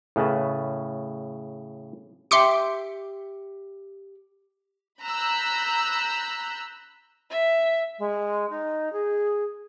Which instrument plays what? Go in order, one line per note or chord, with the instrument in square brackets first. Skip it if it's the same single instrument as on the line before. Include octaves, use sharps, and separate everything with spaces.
[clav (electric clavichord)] A2 C#3 B4 A5
[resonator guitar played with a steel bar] G4 E5 G5 [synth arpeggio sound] C6 D6 C#7
[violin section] A#5 B5 E6 F#6 G6
[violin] E5
[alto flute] G#3
D#4
G#4